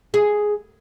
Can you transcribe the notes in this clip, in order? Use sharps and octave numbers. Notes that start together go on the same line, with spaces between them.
G#4